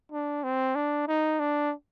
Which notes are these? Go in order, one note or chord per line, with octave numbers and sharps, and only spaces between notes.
D4
C4
D4
D#4
D4